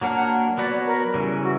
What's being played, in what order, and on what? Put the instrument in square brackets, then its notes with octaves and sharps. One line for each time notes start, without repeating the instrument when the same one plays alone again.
[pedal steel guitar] F#3 A#3 D4 A#4 [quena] F#5
[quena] F#5
[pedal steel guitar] F#3 B3 F#4 B4 [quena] D5
[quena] A#4
[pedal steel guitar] C#3 E3 G3
[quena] F#4